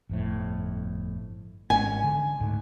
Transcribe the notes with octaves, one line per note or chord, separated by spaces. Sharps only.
G1 F2 A2
G#1 G#3 C#4 G#5
D3
D2 G#2